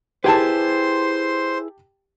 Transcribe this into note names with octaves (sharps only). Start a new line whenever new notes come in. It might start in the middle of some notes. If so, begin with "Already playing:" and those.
E4 G4 G#4 B4 C5 G5 A5 C6